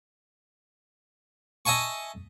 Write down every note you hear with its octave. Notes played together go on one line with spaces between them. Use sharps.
D#5 E5 G#5 A5 C#6